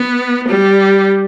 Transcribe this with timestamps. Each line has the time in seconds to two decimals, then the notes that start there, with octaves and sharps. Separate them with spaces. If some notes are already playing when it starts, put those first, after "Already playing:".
Already playing: B3
0.48 G3